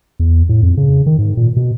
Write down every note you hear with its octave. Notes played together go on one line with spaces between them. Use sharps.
E2
A2
F2
C#3
D#3
G#2
A#2
B2